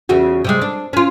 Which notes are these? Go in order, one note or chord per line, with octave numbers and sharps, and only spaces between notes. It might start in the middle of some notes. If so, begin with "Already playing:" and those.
E2 C#3 F#4
C3 G3 G#3
D4
C#4 F4